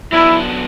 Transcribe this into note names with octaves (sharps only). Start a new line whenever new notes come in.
F#3 B3 D4 E4